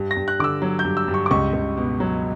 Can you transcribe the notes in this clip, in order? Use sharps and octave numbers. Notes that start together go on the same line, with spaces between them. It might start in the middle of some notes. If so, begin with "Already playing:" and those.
Already playing: G2
A#6
G2
F#6
D3 D6 E6
F#3
G6
G2
E6
G2
C#6
D6
C#2 C#6
C#2
B2
F#3